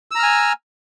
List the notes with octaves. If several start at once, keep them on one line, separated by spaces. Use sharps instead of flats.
G#5 A#5 E6 F6